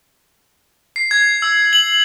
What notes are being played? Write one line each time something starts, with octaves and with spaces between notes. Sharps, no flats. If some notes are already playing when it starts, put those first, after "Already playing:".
C7
G#6
E6
F#7